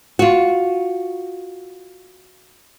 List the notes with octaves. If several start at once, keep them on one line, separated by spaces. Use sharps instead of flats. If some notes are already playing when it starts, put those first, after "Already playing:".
F4 F#4